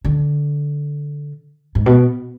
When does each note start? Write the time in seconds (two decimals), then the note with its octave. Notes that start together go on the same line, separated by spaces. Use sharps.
0.05 D3
1.75 G#2
1.86 B2